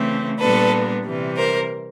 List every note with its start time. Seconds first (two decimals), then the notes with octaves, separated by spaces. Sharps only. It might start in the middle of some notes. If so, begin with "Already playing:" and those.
Already playing: C#3 E3 A3 C4
0.40 A#2 G3 B3 D4 A4 B4
1.05 C3 E3 G3
1.37 A#4 C5